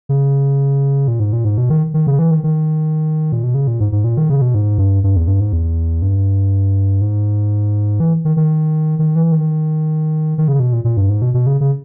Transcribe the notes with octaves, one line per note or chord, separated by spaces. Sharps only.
C#3
A#2
G#2
A#2
G#2
B2
D#3
D#3
C#3
E3
D#3
D#3
A#2
B2
C#3
A#2
G#2
G#2
A#2
D#3
C#3
B2
G#2
G2
G2
E2
G2
G#2
E2
G2
G#2
E3
D#3
D#3
D#3
E3
D#3
D#3
C#3
B2
A#2
A#2
G2
G#2
B2
B2
C#3
C#3